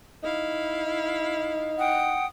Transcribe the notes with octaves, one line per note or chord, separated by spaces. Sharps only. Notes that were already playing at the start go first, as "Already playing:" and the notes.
D#4 E4 F5
F#5 G5 D#6